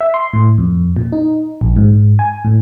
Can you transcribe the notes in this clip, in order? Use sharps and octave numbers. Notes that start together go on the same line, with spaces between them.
E5
C6
A2
F2
A#2
D#4
A#1
G#2
G#5
A2